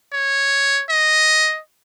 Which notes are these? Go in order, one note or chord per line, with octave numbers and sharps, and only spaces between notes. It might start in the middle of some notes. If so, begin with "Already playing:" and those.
C#5
D#5